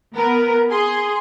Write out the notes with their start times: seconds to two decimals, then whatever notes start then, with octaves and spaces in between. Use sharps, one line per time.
0.15 B3 A#4 B4
0.70 G#4 C6